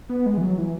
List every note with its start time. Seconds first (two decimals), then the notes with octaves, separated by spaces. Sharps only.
0.09 B3
0.26 G#3
0.37 E3
0.41 F#3
0.58 E3